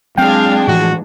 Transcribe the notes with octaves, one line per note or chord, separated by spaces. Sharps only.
F#3 G#3 C4 D4 F5 G5
A2 E3 F3 F#4